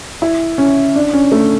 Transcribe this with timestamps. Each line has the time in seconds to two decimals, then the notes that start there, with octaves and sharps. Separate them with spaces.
0.22 E4
0.58 C#4
0.96 D4
1.13 C#4
1.32 A3